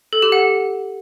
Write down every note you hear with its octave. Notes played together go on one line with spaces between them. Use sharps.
A4
G4
F#5